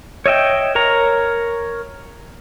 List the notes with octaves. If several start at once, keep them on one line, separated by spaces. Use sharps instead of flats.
C#5 D#5 E5 G5
A#4 C#5 A#5